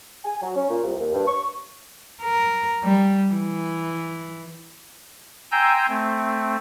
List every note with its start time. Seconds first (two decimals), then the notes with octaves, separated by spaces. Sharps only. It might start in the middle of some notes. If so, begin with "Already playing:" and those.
0.25 G#5
0.42 F#3
0.56 C#4
0.70 A#2
0.84 C2
1.00 D#2
1.13 G2
1.27 C#6
2.22 A#4
2.84 G3
3.33 E3
5.52 G5 G#5 A#5 C6 E6 G6
5.89 A3 C4